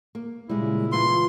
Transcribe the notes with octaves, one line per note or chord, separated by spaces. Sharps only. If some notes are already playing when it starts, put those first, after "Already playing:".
A#3
A#2 C#3 G3 G#3 E4
E3 A#3 F4 C6